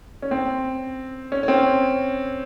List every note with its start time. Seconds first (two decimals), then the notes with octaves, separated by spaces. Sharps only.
0.22 C#4
0.31 C4
1.32 C#4
1.43 C#4
1.48 C4